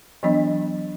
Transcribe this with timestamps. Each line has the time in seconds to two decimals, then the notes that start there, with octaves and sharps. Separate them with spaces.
0.23 E3 F#3 B3 D4 D#5